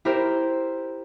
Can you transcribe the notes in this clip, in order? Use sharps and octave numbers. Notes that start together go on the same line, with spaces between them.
E4 G4 A#4 C5